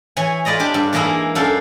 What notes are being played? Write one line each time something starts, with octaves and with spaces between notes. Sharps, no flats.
E3 C#5 G#5
F4 B4 D5 D#5 A#5
D4 G4
G2
E3 G#3 A#3 D#4 E4
F#2 D4 A4 F5